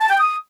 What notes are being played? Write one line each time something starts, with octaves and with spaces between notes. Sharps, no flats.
A5
G5
D#6